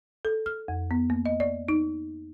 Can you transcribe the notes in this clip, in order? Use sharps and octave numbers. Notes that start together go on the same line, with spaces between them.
A4
F6
F2
B3
A#3
D#5
D5
D#4